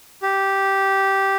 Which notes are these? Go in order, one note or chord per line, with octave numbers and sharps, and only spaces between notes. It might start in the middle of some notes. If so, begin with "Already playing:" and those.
G4